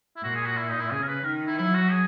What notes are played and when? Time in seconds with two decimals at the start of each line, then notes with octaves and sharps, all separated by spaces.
0.17 E4
0.24 A#2 F#4
0.35 G#4
0.46 F#4
0.57 E4
0.69 D#4
0.80 E4
0.91 C#3 G#4
1.02 A#4
1.08 B4
1.24 D#3 A#4
1.47 E4
1.58 F#3 E4
1.75 F#4
1.91 G#4